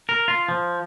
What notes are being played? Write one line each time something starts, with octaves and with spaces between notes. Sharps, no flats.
A#4
F4
F3